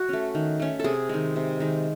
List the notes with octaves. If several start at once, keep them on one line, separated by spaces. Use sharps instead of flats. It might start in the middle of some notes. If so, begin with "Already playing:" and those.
Already playing: F#4
A3 C#4
D#3
A3 C#4
C3 G#4 A4
D#3 G#3
C3
D#3 G#3